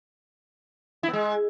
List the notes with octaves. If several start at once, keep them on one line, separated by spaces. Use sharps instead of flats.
E4
B3
G#3